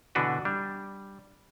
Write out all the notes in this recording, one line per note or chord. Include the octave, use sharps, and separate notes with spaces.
B2 D3 E3 D4 F#4 B4
G3 D4